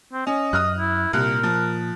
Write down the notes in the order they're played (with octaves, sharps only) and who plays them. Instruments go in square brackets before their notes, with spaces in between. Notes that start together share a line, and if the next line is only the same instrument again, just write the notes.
[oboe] C4
[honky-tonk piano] C#4 [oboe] D#5
[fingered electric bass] F#2 [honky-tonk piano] D#6 F6 F#6
[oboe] E4
[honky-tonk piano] C2 F#6 [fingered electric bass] A#2 [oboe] A#4
[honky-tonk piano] F3